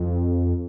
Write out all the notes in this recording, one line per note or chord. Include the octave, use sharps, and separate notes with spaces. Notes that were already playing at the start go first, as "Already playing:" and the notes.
Already playing: F2